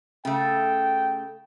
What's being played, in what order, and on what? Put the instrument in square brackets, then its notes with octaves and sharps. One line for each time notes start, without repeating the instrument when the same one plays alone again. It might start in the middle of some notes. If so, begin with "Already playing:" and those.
[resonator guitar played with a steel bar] C#3 A3 [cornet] G5